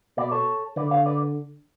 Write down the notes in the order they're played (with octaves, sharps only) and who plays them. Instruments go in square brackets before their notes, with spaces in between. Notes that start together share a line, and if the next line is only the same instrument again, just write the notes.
[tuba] B2 [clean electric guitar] B4 D5
[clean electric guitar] A4 C#5
[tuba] D3 [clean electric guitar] B4 D5
[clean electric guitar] C#5 F5
B4 D5